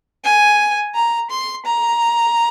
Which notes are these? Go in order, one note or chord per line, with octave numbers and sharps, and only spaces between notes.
G#5
A#5
C6
A#5